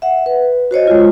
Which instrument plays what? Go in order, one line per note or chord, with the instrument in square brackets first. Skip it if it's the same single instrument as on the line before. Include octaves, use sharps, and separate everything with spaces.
[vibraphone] E5 F#5
B4
F#4 C5 C#5 D#5
G#3 F4